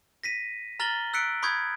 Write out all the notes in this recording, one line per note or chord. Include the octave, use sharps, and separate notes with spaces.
A#6 B6 D#7
A#5 F6 A6 A#6 F#7 G7
E6 F#6 B6 C#7 D7
B5 C#6 D#6 G6 G#6